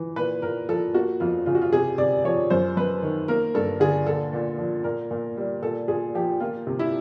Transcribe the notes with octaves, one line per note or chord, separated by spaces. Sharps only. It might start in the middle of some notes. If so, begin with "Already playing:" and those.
Already playing: E3
A#2 B4
A#2 A#4
F3 A4
A#3 F#4
F2 F4
C#3 F4
F#4
F4
C3 G#4
C3 D5
F3 C#5
F#2 C5
F#2 B4
D#3
A#3 A#4
G2 A4
D3 G#4
A#2 A4
A#2
F3
A#2 A#4
A#2
G3
A#2 A4
A#2 G#4
F3 G4
A#3 F4
C3
E4